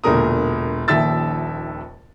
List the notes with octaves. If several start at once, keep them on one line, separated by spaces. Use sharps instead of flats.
E1 A#2 D3 A#4 D#6
D#1 A#1 D#2 E5 E6 A6